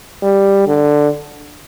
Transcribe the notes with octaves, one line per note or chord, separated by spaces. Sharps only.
G3
D3